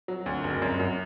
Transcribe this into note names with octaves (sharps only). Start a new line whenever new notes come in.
F#3
D2
F#1
F#2
F#2